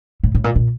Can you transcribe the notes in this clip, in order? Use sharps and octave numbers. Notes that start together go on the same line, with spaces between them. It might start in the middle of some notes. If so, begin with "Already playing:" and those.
A2
A2
A#2
A#2